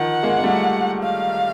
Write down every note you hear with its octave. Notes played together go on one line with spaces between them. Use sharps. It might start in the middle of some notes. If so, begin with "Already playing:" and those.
Already playing: D#3 F3 F#5
G#3 A#3
A#3
G3 A3
F5